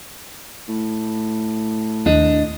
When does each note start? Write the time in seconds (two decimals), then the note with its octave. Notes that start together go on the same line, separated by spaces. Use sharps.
0.68 A2
2.06 D#2 D4 D#5